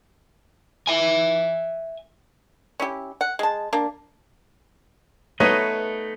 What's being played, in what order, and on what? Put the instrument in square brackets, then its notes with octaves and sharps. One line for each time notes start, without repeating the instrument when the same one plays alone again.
[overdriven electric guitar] E5 G#5
[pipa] C#4 E4 G4
F#5
G#3 A5
A#3 D4
[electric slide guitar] A3 B4 D#5 [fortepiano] B3 D#4 C#5